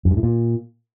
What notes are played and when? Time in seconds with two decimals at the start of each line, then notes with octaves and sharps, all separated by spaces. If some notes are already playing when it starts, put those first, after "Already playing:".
0.05 F#2
0.11 G2
0.17 A2
0.23 A#2